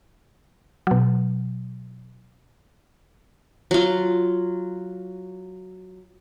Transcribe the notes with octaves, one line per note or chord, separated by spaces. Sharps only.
B2 F#3
F#3 F4